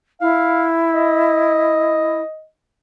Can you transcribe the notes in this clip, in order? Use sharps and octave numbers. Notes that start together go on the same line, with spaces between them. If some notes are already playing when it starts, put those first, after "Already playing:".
E4 F5
D#5